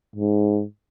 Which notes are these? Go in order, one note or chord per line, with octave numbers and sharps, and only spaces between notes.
G#2